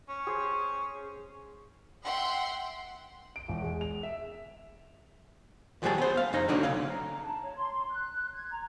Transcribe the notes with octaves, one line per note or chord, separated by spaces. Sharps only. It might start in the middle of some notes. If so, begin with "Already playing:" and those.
C#4
G#4 C5
E5 F#5 G5 C6
D7
E1
G#3
F7
E5
D#2 F3 G3 F#4 G#4 A5
B3 C5
F5
F2 D#4 A#5
B1 A#2 D3 D4 D#4 F#4
B1 C#3 F5
A#5
A5
C#5
C6
F#6
G#6
A#5